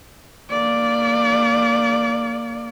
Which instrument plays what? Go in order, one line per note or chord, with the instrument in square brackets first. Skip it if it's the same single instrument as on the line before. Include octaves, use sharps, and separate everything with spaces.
[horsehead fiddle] A#3 D5